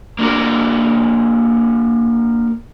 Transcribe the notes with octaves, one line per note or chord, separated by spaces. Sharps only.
A#3 D4 F#4 A#4